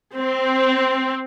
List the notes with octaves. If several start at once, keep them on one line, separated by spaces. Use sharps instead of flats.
C4